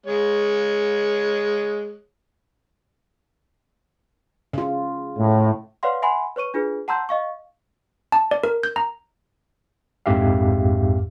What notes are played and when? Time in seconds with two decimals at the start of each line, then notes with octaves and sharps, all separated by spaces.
0.06 G#3 C#5
4.53 C#3 F4
5.18 A2
5.83 B4 C#5 D5 F5 F#5 C6
6.02 E5 F#5 G#5 B5 C6
6.36 B4 C#5 C#6 D#7
6.54 D4 F4 G#4 B4
6.88 F#5 A5 A#5 C6 E6 G6
7.09 D#5 F5 C#6
8.12 A5
8.31 D5
8.44 A#4
8.63 G6
8.76 A#5
10.06 A#1 F2 G#2 G4 E5 F5